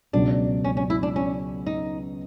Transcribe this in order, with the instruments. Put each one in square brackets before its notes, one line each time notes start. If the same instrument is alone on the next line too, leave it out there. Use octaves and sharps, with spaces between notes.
[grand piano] C#2 B2 F#3 [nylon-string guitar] D4
[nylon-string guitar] C#4
C#4
E4
D4
C#4
D#4